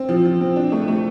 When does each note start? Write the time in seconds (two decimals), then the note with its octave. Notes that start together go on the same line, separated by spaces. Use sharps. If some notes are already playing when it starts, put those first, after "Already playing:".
Already playing: C4
0.09 F3
0.25 F3
0.41 C4
0.56 D4
0.72 A3
0.88 A3